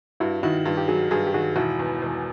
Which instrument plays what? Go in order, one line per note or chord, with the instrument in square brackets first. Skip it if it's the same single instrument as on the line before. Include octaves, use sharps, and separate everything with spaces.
[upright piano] G2 [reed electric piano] E4 F#4
[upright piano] D#3 [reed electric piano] E4 F#4
[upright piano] G2 [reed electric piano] F4 G4
[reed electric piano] G4
[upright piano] F#3 [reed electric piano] F#4 G#4
[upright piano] G2 [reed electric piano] F#4 G#4
[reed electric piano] G4
[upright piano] D#3 [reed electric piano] F#4 G#4
[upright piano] E1 [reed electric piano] E4 F#4
[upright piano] E2
E1